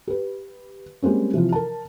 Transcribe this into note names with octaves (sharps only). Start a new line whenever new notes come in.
G4 B4
G3 G#3 A#3 C4 C#4
C3 E3 F3 F4
A#4 A5